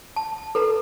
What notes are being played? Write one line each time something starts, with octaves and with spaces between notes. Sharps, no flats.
A5
A4 B4 A#5